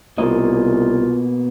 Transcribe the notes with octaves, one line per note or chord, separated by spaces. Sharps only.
C2 B2 A#3 F4 D#5